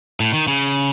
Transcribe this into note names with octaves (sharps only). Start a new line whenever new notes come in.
A2
D#3
C#3